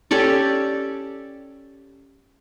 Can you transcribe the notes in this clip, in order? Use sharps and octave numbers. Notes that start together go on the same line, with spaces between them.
C#4 G4 A4 D5